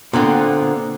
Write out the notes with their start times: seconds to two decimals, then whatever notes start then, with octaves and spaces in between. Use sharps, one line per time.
0.13 A#2 D3 B3 C4